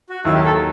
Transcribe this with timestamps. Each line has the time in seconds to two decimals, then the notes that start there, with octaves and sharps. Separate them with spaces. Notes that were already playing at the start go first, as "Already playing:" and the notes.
0.10 F#4
0.25 D#2 D#3 F#3 E4
0.34 G4
0.45 A4